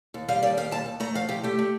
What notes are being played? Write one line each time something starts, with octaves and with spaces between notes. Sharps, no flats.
D#2
G3 F5
D#2 D5
G3 F5
D#2 A5
D#2
A3 A#5
F3 F5
D2 G4
A3 G4
A3